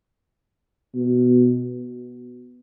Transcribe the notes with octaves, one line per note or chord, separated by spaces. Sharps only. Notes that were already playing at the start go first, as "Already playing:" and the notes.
B2